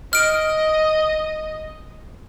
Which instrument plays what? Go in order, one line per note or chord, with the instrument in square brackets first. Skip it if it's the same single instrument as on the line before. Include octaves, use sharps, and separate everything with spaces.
[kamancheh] D#5 [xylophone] F6 D7